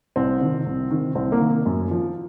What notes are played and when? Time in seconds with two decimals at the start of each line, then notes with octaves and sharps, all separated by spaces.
0.16 C2 C4
0.41 C3 D#3
0.66 C2
0.91 C3 D#3
1.15 C2 C4
1.32 A#3
1.41 C3 D#3
1.66 F#2
1.91 F3